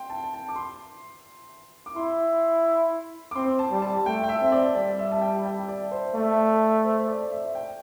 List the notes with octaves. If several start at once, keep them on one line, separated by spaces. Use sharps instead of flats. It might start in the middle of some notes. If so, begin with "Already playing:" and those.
Already playing: G5 C6
A5
A5
D6
C6
D6
E4 C6
D6
C4 C6
A5
G3
A5
A3 G5
G5
E5
C4
D5
G3 D5
E5
A5
G5
G5
D5
C5
A3 D5
E5
C5
D5
E5
G5